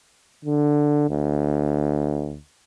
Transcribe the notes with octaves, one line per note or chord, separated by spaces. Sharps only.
D3
D2